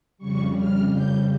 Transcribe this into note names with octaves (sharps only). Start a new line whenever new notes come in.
F2 C#3 G3 C#6
F6
G6